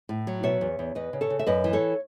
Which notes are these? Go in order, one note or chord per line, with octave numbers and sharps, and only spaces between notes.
A2
F#3
B2 C#5 E5
E2
E2
E2 B4 D#5
C#3
A4 C#5
C#3
E5
F#2 B4 D#5
E3
A4 C#5